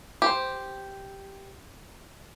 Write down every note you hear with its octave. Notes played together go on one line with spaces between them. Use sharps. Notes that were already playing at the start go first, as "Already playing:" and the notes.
G4 C5